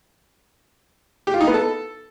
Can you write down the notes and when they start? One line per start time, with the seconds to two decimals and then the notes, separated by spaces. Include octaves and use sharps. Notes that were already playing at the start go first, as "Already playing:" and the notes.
1.27 G4
1.34 F4
1.41 D#4
1.47 B3
1.54 A4